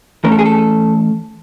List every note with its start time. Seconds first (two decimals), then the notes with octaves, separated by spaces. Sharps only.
0.24 E3 A3 C#4 A#4
0.32 A4
0.39 G#4
0.46 A4